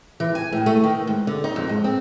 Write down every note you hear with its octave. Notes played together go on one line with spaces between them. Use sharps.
E3
G#5
A2
A3
D#3
G#2
D3
D#4
F2
G#2
C4